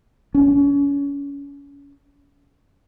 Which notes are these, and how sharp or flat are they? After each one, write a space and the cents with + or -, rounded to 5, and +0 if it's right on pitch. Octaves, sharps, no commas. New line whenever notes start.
C#4 +30